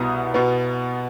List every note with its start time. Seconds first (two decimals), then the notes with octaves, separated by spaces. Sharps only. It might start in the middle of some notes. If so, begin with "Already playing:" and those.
Already playing: C2 B2 B3 D#6
0.34 B2 B3